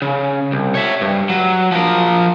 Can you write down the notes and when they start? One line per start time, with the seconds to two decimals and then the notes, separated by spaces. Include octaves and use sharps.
0.02 C#3
0.52 C2
0.75 C#5 E5
1.01 G2
1.29 F#3
1.72 F3 A#4